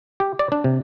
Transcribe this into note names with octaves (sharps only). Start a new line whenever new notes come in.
G4
D5
D4
C3